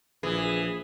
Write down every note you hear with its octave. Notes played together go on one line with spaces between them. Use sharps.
A#1 E3 G#4